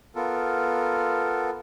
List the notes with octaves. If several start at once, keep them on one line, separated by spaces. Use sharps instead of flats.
B3 F4 A4 A#4